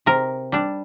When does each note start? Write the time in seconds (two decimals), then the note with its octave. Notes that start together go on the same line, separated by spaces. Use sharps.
0.06 C3 A#4
0.52 G3 D4